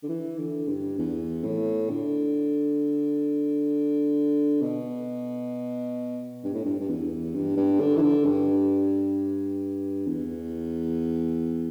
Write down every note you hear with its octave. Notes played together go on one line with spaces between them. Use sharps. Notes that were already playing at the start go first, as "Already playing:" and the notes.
D3
E3
D3
G2
E2
A2
D3
B2
G2
A2
G2
G2
E2
G2
G2
D3
E3
D3
G2
E2